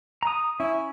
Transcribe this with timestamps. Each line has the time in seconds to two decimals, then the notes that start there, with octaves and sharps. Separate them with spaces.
0.23 A#5 D#6
0.60 C#4 E4